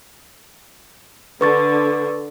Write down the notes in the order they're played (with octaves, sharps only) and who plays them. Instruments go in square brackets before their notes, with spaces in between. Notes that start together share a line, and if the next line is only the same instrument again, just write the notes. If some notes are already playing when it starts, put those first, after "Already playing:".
[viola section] D3 [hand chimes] B4 C#6 A6